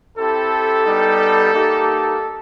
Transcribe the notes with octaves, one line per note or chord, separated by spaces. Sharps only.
C4 E4 G4 A4
G3 B3 D#4 G4
A#3 D#4 G4